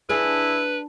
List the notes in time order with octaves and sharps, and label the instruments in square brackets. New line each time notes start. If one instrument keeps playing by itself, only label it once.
[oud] D4 G#4 [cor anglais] E4 [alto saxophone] B4